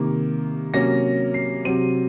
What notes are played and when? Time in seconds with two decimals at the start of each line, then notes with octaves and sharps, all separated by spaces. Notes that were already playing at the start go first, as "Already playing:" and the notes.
Already playing: C3 D#3 A#3
0.74 C3 F#3 A#3 C#4 A#6
1.34 C7
1.65 C3 F#3 C4 D#7